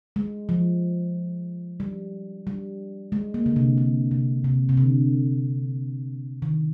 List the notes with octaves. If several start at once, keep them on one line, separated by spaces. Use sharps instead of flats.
G#3
F3
G3
G3
G#3
A#3
D3
C3
D3
C3
C3
C3
D3
D#3